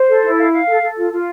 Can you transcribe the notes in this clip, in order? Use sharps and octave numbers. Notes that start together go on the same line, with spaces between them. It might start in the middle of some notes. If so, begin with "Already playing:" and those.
Already playing: C5
A4
E4
F5
F5
A4
A4
F4
F4